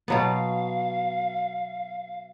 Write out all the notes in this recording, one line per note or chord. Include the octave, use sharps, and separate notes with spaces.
B2 F#3 B3 F5